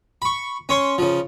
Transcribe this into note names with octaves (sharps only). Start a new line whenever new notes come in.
B5 C#6
C#4 C#5 C6 C#6
C#3 F3